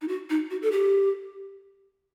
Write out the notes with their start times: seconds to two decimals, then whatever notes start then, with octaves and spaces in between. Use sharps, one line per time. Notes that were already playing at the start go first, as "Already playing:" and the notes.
0.01 D#4
0.08 F#4
0.30 D#4
0.51 F#4
0.62 A4
0.72 G4